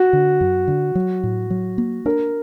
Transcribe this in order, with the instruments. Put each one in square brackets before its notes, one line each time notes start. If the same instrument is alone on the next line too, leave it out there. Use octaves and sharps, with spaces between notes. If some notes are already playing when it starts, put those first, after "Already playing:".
Already playing: [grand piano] F#4
[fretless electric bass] D3
F#2
D3
F#3
A2
F#3
A#3
[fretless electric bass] D4 [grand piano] A#4